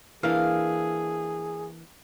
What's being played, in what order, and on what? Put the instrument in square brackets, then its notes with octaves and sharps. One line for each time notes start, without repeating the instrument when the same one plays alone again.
[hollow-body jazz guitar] E3 A#3 D4 [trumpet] G#4 [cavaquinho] F5